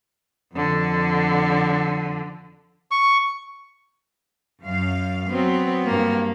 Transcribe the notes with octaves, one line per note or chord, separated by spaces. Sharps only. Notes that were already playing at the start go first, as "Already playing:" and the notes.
F2 D3
C#6
F#2 F5
F#3 B3 C4
G2 A#3